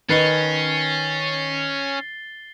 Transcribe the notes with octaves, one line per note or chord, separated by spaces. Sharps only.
D#3 C#4 B4 D#5 A6 C7 G7